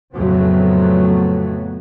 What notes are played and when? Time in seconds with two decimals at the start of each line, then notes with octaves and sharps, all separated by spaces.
0.16 F2 A2 C#3 F#3 A3 B3